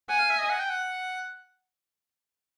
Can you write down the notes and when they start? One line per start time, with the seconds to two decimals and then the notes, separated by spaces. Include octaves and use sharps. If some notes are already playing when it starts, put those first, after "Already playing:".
0.09 F#5 G#5
0.19 F5
0.30 E5
0.39 D#5
0.50 F#5
0.60 G5
0.70 F#5